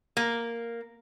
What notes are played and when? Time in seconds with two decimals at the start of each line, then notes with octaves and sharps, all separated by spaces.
0.17 A#3